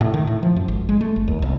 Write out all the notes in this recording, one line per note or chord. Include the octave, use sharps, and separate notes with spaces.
A2
D#3
A2
F3
F#2
G#1
G#3
A3
G1
D#2
C2